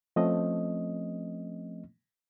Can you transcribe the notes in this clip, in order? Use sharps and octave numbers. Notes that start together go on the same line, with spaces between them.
F3 A3 C4 C#4 D#5